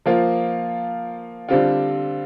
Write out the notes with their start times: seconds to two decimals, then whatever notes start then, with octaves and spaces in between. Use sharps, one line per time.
0.06 F3 A#3 F4
1.49 D3 G3 C4 F4